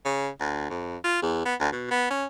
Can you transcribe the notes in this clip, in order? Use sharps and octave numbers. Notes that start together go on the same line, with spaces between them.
C#3
D2
F2
F4
E2
B3
D2
B2
B3
C#4